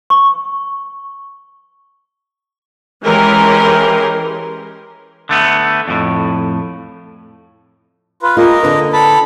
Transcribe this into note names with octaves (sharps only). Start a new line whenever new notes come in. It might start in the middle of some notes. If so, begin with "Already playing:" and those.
C#6
E3 G#3 C#4 G4 A#4 C6
D3 A3 B3
F2 A2
F4 B4
A#3 F4 G#4 A#4 D#5
D3 D4 B4
A4 A5 B5